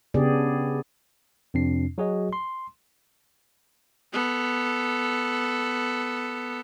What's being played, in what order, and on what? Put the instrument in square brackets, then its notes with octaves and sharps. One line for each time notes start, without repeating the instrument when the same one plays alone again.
[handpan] C#3 B3 D4 G4 G#4 D5
[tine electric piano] F2 C3 C4 D4 C7
F#3 F#4 G#4 C#5 D#5
C6
[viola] B3 A4